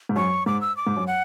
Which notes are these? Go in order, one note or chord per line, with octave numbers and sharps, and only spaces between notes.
G#2
F#2 C#6
G#2 D6
E6
D6
G#2
F#2
F#5